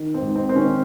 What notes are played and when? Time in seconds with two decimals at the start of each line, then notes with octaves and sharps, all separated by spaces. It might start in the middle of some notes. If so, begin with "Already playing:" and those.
Already playing: D#3
0.14 C4
0.21 G#2
0.35 C4
0.49 D#3 C4
0.56 C#4